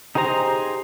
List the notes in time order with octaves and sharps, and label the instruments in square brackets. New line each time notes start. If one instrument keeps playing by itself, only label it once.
[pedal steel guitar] D#4 G4 G#4 C5 A#5